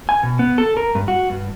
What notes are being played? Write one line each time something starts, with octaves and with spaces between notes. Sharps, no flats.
G#5
B2
B3
A4
A#4
G2
F#4
G2